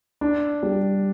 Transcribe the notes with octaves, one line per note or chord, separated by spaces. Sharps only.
D4
G3